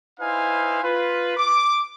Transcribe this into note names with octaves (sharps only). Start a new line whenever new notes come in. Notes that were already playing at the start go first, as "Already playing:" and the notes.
D#4 E4 B4 C5 F5 G#5
F4 B4
D6